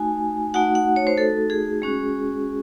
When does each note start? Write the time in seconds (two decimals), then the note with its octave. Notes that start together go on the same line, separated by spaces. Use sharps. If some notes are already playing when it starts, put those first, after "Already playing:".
Already playing: A3 D#4 F#4 G#5
0.54 A3 D#4 F#4 F#5
0.75 F#5
0.96 C#5
1.07 C5
1.18 A4
1.50 G#4
1.82 G#3 C#4 F#4